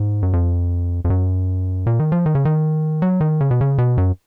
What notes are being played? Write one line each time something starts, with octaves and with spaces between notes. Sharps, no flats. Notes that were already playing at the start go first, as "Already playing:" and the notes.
Already playing: G#2
F#2
F2
F2
F#2
A#2
D#3
F3
D#3
C#3
D#3
F#3
D#3
C#3
B2
C#3
B2
F#2